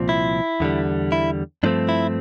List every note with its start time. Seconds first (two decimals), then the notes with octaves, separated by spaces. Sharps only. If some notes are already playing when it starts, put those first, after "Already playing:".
Already playing: C2 A#2 F3 C4
0.09 E4
0.60 E2 D3 G3
1.12 E4
1.63 G2 F3 A3 C4 D4
1.89 E4